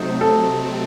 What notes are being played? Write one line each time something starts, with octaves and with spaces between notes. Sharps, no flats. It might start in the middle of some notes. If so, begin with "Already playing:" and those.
Already playing: C3 F#3 A3 C4 D#4
A4